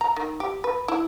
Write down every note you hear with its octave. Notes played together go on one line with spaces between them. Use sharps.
A#5
D#3
G4
B4
E4